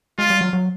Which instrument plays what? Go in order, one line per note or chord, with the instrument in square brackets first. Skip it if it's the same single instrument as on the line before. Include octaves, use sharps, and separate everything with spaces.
[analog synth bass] G#3 [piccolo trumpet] F4
[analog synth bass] G3
F#3
F#3